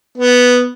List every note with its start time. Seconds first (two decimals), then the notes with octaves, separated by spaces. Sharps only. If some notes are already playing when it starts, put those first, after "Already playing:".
0.18 B3